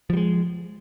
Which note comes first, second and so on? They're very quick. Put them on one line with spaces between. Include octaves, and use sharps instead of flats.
F3 G3 G#3